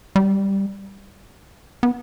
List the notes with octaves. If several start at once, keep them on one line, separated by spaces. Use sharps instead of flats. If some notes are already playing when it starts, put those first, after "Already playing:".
G3
B3